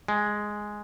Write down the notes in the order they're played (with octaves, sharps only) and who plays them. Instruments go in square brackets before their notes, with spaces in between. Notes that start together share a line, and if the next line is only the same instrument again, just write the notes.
[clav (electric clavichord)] G#3